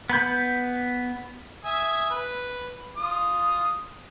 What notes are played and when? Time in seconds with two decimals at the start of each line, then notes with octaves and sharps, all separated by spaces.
0.10 B3 B5 G6
1.64 E5 G#5 D#6
2.10 B4
2.97 F4 D#6